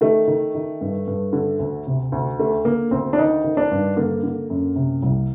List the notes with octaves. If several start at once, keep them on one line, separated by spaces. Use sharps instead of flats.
D#3 A3
D#3
D#3
G2
G2
D3
D2
C3
D2
D3 A3
D3 A#3
D2 C4
D4
D#3 D#4
D#3
D4
G2
D3 A#3
D3
F#2
C3
C2